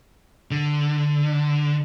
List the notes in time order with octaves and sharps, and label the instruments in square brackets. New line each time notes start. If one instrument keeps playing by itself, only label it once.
[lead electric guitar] D3